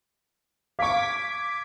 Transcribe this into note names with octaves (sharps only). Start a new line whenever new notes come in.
F5 C#6 D6 G#6 B6